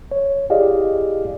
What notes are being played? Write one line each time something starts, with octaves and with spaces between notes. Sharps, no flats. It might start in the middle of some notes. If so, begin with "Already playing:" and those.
C#5
E4 G4 G#4 D5 D#5 F5